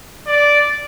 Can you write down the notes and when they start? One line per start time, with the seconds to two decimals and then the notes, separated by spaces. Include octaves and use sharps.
0.27 D5